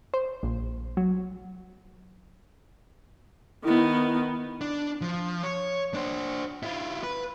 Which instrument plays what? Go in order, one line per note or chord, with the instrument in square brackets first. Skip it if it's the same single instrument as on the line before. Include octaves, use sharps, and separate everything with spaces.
[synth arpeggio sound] C5
A#1
F#3
[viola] D#3 B3 [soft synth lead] E4
[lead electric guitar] D4
F3
C#5
D4 C5
E4 F4
B4